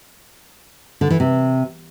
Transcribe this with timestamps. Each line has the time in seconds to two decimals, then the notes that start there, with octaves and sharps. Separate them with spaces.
1.01 D3
1.10 E3
1.20 C3